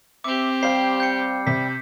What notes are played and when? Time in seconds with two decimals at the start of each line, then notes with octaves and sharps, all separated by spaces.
0.24 C4 G4 E5 D6
0.63 G3 C5 F5 G5 C7
1.00 G6 C#7
1.47 C3 B6